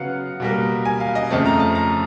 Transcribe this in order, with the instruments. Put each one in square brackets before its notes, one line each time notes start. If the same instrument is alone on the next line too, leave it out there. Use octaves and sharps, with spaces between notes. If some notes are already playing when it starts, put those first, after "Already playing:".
Already playing: [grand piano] C#3 F#3 B3 F5 F#5
B2 G3 A#3
G#5
F5
D#5
F2 C#3 F3 A3 C4 A5
A#5
A5
A#5